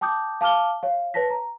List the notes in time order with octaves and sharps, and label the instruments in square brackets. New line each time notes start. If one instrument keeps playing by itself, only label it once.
[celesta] G5 A5 D6 D#6 G6
F5 A5 D6 F6 G7
C#5 F5
B4 C#5 A5 A#6 B6
A#5